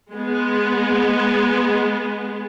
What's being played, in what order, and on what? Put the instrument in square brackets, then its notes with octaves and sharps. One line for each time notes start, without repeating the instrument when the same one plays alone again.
[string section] G#3 B3